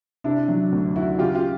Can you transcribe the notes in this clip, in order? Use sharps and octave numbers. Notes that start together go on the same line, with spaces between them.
C3 D4 E4
F#3
D2
D#3 E4 F#4
C#3 F4 G4
F4 G4